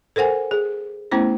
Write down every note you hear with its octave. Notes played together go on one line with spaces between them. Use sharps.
A4 A#4 C5 F#5 G#5
G#4
A3 B3 C#4 E4 C5